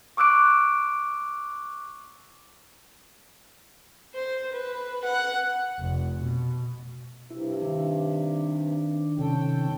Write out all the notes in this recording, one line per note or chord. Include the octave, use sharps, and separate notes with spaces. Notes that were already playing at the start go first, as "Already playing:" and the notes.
C#6 D6 E6 F#6 D7
C5
B4
F#5
F1
B2
G2 C3 E4
D#3 D4
C3 D#3 C#4 A4 G5